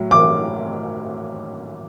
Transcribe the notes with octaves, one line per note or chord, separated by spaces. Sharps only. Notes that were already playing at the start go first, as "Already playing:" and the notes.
Already playing: A2 F#3
D6